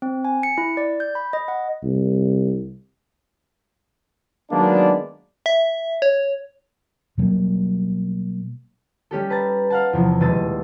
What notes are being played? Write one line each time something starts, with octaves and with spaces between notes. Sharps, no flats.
C4
G#5
C#7
E4
D5
G6
B5
D#5
F#5
C2
D#3 F#3 G#3 A#3 B3 D4
E5
C#5
B2 F#3 G3 A#3
G3 C#4 G4 A4
B4 A5 A#5 A6
F5 F#5 A5
E2 C3 F3
D#1 B2 G#3 E6 A6 D#7